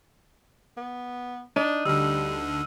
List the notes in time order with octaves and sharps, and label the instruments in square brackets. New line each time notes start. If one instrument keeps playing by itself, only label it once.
[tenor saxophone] B3
[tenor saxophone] D4 [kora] D#4 [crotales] D#7
[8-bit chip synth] D2 D3 [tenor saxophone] G3 [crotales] E6 F6